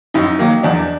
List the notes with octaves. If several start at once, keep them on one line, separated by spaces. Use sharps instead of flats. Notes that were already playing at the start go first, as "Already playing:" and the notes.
F#2 D#4
D#3 F#3 A#3
E2 D4